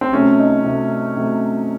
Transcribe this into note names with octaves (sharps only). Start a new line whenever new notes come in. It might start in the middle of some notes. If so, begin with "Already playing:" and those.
C4
C3 F#3 A3 C#4
D#4
C3 F#3 A3
C3 F#3 A3